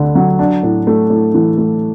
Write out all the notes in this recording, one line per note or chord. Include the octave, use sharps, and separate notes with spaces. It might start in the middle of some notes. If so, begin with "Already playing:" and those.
Already playing: D2 D3
F#3
D4
A2
A3
A2
E3
A3